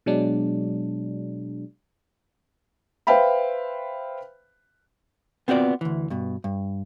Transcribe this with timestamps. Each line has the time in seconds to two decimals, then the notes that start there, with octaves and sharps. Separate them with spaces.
0.06 B2 F#3 G#3 D4
3.07 B4 C5 E5 F5 G5 B5
5.48 B3 C4 F4 F#4 D5
5.81 D2 E3
6.10 G2 B2
6.44 G2